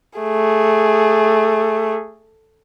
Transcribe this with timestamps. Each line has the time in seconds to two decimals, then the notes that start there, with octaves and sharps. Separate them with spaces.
0.19 A3 G#4